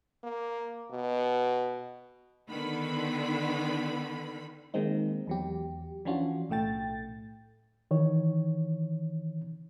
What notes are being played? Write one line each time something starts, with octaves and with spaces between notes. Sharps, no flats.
A#3
B2
D3 D#3 B3 B5
D#3 G#3 A#3 C4 D#4
E2 F#3 G4
E3 F3 C#4 D4 F4 F#4
B1 A2 A3 G5 A6
D#3 E3 C#5